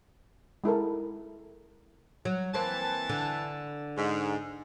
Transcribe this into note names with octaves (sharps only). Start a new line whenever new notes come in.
G#3 E4 A4 A#4
F#3
E3 A#3 C4 A5
D3
G#2